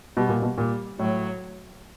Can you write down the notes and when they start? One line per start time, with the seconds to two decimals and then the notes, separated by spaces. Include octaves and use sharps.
0.17 B2 G3
0.29 A#2
0.42 B2
0.58 A#2 G3
0.99 A2 F#3